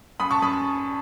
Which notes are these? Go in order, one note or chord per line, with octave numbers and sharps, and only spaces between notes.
F#2 B5 D#6
A5 C#6
F#2 B5 D#6